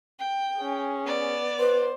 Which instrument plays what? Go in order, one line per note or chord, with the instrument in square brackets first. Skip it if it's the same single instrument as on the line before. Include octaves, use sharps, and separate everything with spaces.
[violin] G5
[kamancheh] C#4 G#4
[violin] B3 D5
[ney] B4 [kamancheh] C5